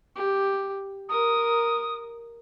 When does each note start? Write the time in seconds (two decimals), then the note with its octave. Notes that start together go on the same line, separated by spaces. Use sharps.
0.16 G4
1.09 A#4 D#6